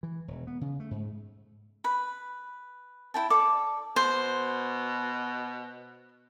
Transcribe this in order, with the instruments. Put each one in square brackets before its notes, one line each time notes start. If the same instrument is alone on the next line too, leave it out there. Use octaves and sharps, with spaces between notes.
[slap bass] E3
E1
B3
C#3
A3
G#2
[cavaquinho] B4 B5
E4 G5 A5
A4 D5 D6
[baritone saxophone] B2 [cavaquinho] C5